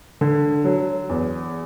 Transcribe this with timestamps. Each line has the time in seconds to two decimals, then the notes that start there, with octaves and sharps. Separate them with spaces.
0.21 D3
0.64 F#3
1.09 E2